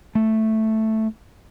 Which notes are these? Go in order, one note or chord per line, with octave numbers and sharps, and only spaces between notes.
A3